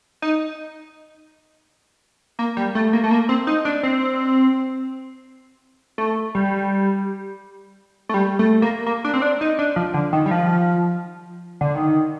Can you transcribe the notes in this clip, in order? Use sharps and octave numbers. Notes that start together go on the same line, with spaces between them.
D#4
A#3
G3
A3
A#3
A3
A#3
C4
D#4
D4
C4
A3
G3
A3
G3
A3
A#3
A#3
D4
C4
D4
D#4
D4
F3
D3
D#3
G3
F3
D3
D#3